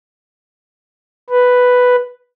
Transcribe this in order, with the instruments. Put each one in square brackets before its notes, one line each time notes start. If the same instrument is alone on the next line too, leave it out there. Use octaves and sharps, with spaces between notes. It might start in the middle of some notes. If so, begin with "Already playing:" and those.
[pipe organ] B4